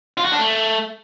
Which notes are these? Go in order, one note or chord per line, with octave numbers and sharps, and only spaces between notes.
F4
F#4
D4
A3